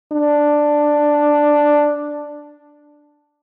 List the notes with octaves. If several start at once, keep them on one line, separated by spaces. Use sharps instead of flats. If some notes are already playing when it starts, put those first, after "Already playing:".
D4